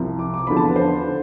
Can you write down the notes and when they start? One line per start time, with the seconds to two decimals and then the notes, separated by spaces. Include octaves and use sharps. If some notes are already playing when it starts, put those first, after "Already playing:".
Already playing: C2 C3 F3
0.19 D6
0.34 D6
0.47 E2 D3 F3 B5
0.57 A5
0.67 B4
0.76 C5
1.04 D3